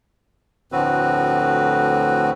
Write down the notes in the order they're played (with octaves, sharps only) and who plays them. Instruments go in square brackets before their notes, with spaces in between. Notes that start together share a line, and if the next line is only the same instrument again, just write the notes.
[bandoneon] D2 A2 F3 C4 F#4 B4